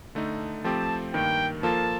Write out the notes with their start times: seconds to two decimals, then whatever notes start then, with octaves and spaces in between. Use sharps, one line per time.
0.15 D3 A3 D#4
0.64 F3 A3 C4 G4 A5
1.14 G2 D#3 A#3 G5
1.63 F3 A#3 F4 A4 A5